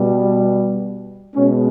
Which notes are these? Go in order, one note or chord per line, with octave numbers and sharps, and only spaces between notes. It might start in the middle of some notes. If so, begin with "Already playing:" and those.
Already playing: B2 G3
B2 G#3 C#4